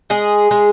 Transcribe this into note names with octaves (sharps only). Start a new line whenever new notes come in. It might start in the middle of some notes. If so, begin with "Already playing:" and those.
G#3 G#4
G#3